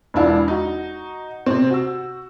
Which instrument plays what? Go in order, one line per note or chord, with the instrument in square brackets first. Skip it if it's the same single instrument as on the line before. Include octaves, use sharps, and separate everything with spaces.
[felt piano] E1 C#2 D4 E4 F5
D#4 F#4
C3 C4
F#4 E6